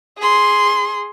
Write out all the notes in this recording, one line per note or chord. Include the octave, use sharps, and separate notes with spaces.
G#4 C6